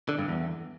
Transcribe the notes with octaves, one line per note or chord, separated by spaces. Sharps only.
D3
G2
E2